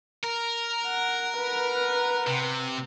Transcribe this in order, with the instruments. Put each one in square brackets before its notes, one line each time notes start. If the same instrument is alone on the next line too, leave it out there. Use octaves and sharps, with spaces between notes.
[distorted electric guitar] A#4
[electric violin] F#5
B4 F#5
[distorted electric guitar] C3